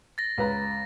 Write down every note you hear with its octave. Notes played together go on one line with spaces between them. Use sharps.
A6 A#6
C#2 B4 A#5